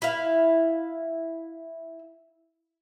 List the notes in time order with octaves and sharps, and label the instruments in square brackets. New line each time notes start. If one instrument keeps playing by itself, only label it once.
[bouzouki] E4 F5